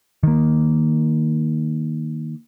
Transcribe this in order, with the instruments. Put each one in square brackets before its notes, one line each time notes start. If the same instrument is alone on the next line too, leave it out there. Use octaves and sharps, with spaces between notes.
[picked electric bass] D#3 A#3